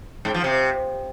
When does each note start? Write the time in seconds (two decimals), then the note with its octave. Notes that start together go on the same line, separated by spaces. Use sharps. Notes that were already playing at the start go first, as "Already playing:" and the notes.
0.25 G#2
0.34 F3
0.44 C3